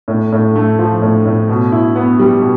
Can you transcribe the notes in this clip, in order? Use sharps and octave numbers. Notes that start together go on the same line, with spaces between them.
A2
A2
A3
F3
A2
A2
B2
E4
B3
G3
B2